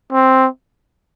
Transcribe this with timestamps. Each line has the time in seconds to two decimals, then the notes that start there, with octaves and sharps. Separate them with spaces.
0.13 C4